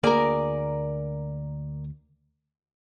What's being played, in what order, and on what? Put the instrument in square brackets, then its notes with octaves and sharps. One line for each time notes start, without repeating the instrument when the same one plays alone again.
[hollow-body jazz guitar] D2 A#3 G#4 [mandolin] A#4 D5